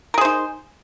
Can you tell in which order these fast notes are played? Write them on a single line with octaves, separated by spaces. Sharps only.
A#4 G#4 C5 D#4